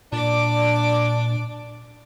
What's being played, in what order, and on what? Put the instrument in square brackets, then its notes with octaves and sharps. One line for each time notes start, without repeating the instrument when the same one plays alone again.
[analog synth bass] A#2 [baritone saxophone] D4 [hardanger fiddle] D5 D6